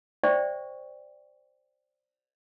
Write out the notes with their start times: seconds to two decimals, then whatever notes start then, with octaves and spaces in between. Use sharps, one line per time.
0.23 C5 D5 E5 G5 C#6